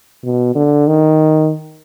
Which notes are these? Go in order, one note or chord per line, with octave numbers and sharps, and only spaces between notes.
B2
D3
D#3